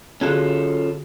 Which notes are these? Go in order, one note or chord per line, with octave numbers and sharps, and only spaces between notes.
D3 C#4 F4 F#4 G#4 A4